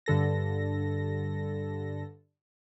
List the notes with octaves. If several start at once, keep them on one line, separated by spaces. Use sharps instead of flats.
G2 D3 A4 A#6